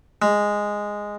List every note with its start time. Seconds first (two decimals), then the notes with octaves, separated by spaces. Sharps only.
0.22 G#3